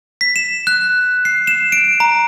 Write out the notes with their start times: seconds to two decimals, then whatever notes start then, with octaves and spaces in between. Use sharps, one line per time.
0.21 B6
0.36 E7
0.67 F#6
1.25 C7
1.47 E7
1.72 D7
2.00 A#5